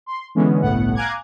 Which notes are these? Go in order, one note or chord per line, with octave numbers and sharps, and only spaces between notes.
C6
D3 E3 G#3 B3 C#4
G1 C2 A2 B3 F#5
F5 G#5 A#5 D6 F#6 G#6